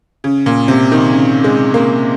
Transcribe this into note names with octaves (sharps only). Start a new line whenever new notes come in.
C#3
A#2
C3
D#3
C#3
G#3
A#3